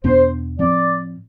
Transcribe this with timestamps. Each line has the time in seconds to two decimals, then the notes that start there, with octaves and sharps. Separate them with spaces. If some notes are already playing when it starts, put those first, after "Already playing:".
0.04 E2 B2 B3 D4 C5
0.59 A2 F3 C4 D5